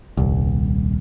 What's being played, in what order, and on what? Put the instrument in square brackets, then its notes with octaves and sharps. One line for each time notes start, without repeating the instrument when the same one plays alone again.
[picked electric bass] D#1 C2